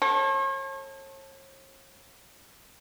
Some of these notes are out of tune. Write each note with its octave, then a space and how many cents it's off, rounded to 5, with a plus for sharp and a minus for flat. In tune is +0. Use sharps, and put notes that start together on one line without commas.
A4 +0 C#5 -45 B5 +0